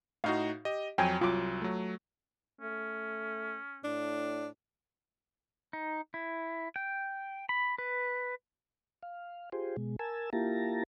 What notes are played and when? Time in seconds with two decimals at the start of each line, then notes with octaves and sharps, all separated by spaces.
0.24 A2 D#4 F#4 F5
0.65 G4 D#5
0.98 F2 F#3 G5 G#5
1.21 C2 F#3 F4 D6
1.62 F#3 A3
2.61 A3 C#4
3.84 A2 D4
5.73 D#4
6.14 E4
6.76 G5
7.49 B5
7.78 B4
9.03 F5
9.52 F4 G4 G#4 C5
9.76 B2 G#3
9.99 A#4 G#5 A5 E6
10.33 A#3 E4 F4 G4 A5 A#5